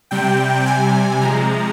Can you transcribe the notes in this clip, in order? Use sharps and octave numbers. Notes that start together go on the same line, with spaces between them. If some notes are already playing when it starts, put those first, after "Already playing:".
C3 G3 G5
G#5
C3 F3 G#3 A#5